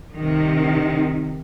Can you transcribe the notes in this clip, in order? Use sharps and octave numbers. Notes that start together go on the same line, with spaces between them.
C2 C3 D#3